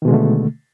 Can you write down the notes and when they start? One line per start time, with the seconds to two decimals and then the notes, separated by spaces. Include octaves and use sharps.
0.02 D#3
0.05 B2
0.08 G#3
0.11 D3
0.14 A3